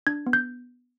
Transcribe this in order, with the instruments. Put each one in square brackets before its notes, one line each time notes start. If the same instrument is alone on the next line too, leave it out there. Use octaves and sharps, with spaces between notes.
[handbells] D4 G#6
B3
G6